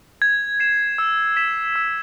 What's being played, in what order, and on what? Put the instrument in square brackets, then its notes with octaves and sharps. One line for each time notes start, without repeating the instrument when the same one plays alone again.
[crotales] G#6
C7 E7
E6
B6 E7
E6